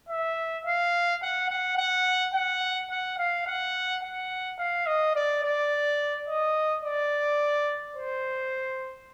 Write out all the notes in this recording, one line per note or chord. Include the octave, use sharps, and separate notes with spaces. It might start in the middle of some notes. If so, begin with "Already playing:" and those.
E5
F5
F#5
F#5
F#5
F#5
F#5
F5
F#5
F#5
F5
D#5
D5
D5
D#5
D5
C5